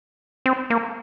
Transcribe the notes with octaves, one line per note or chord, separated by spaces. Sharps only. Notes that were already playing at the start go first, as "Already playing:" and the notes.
C4
A#3